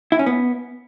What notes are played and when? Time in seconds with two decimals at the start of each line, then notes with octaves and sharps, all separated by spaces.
0.12 E4
0.19 C#4
0.26 B3